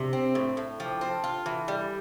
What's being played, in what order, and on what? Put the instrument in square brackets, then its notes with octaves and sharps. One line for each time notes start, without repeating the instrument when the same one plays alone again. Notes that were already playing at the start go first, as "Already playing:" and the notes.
Already playing: [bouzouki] C3 [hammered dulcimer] D4
[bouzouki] C4
A2
A2
[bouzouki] F3 [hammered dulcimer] G4
[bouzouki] C4 [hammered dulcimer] A4
[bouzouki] F4 [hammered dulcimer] A4
[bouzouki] E3
G3